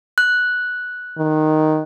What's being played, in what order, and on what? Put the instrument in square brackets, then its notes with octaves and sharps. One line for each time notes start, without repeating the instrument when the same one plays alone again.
[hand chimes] F#6
[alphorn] D#3